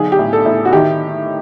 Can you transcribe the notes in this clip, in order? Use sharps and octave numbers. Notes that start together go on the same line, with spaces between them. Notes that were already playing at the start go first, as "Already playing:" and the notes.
Already playing: B1 D3 G#4
G4
A2
A4
A2
F#4
D#3 G4